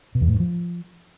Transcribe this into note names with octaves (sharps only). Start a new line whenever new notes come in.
B2
E2
A2
G2
F3